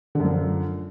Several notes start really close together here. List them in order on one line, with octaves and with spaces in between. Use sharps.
D3 F#2 F3